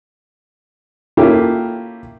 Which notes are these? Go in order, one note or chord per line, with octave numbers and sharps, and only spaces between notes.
A#3 C#4 E4 F4 G4 A4